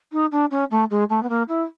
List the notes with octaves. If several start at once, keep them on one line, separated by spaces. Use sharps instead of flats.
D#4
D4
C#4
A3
G#3
A3
B3
A#3
E4